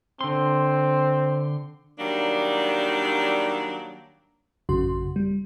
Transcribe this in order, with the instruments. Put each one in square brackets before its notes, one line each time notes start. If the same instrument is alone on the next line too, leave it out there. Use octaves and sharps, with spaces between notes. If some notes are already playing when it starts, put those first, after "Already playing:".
[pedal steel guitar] D3 C6 [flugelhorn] C4
[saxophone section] D#3 F#3 G3 A#3 D4
[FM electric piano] A1 F#2 C#3 F#4 C6
G3